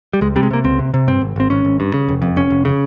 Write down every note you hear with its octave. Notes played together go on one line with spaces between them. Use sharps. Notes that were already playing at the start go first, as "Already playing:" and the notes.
G3
C#2 G#3
C3 G3
G#3
C3 A#3
C#2 C4
C3
C3
G2 C4
G#1
G#1 C4
G#1 C#4
G#1
G2
C#3
F1
F2
F1 C#4
F1
C#3